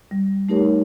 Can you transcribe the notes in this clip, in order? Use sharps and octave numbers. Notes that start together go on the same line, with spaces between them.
G3
A3 D#4 G4 A#4 C#5